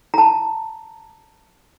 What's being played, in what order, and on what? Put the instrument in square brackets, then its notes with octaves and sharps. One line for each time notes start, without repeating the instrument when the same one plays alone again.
[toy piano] A5 A#5